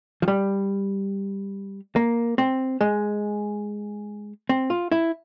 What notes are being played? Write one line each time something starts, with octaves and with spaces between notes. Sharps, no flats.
F3
G3
A#3
C4
G#3
C4
F4
E4